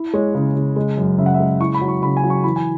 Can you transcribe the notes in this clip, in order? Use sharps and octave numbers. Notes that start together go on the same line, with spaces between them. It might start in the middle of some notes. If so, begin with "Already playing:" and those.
Already playing: E4
G#3 C#5
C#3
C#3
G#3
F#2
C#3 E5
F#5
E5
G#3
E4 C#6
B5
F#3
C#6
C#3 B5
G#5
F#3
C#6
E3 B5
G#5